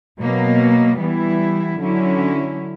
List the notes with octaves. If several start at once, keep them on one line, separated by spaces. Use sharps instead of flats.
B2 F#3 A#3
E3 G3 B3 E4
D3 F#3 C#4 E4